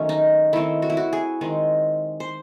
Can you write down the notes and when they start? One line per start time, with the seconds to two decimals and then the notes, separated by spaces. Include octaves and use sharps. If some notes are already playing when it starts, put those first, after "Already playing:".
Already playing: D#3 F#3 A3 C4 C#4
0.09 D#4
0.53 D#3 A3 C4 E4
0.82 F#4
0.90 E4
0.97 F#4
1.13 G#4
1.41 D#3 G#3 C4
2.20 C5